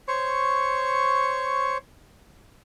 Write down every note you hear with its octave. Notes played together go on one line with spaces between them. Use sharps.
C5 C#5 C#6